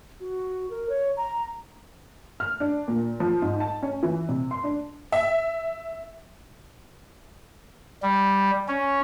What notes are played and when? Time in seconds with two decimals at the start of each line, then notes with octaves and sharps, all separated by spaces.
0.20 F#4
0.70 A#4
0.89 C#5
1.17 A#5
2.40 F6
2.60 D4
2.88 A#2
3.20 F3
3.42 G#2
3.60 A5
3.83 C#4
4.03 E3
4.29 C3
4.51 C6
4.64 D4
5.12 E5
8.03 G3
8.68 C#4